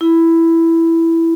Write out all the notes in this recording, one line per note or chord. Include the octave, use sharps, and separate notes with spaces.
E4